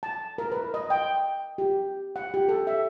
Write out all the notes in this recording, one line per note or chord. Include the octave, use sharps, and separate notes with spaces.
A5
A#4
B4
D#5
G5
G4
F#5
G4
A4
E5